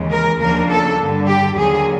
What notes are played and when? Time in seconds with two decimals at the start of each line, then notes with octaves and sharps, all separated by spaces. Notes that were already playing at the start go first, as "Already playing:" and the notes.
Already playing: D#2 C#3 E3 G#3
0.10 A#4
0.39 D#2 C#3 F3 A#3 D4 A#4
0.69 A4
0.99 G2 D3 G3
1.28 G4
1.57 D#2 D3 F#3 A#3 G#4